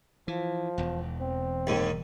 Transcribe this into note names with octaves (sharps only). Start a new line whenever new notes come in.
E3 F3
E1 E2
C4
D#2 G#2